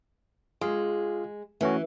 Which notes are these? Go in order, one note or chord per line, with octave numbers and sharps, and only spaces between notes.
G#3 F4 G#4 F5
E3 A3 C#4 F#4